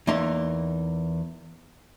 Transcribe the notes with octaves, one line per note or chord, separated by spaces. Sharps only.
E2 A#3 D#4 E5 C6